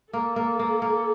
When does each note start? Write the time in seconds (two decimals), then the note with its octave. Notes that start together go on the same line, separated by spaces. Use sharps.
0.13 A#3 A4
0.36 A#3
0.59 A#3
0.82 A#3